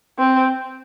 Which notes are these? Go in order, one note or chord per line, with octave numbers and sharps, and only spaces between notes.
C4